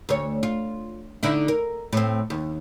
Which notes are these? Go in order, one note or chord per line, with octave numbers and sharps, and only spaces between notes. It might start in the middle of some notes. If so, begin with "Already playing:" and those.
D2 C#5
F4
D3 D#4 E4
A#4
A2 C4
D#2